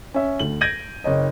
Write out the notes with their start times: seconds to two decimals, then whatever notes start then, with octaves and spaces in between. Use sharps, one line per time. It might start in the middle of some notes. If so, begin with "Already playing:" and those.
0.14 C#4 E5
0.39 D2 F#7
0.61 G6 G#6 A#6 D7 D#7 F#7
1.04 F#1 C#5 D#5